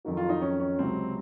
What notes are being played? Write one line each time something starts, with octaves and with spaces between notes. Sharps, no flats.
F2 D#3 F#3
F4
D#4
C#4
C#4
C#2 C3 F#3 C4